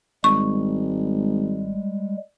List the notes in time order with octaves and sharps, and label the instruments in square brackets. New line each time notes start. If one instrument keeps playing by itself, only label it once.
[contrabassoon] G#1 [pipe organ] G3 G#3 [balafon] C#6